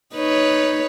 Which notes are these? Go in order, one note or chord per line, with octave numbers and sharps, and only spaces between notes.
D#4 B4 C#5